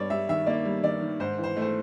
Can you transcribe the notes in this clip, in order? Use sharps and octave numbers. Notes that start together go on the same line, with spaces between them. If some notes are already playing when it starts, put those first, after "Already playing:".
Already playing: G2 G3 C#5 D5
G3 E5
D#3 E5
A#3 D5
G3
D#3 D5
D#3
G#2 C5
E3
C5
A3
C5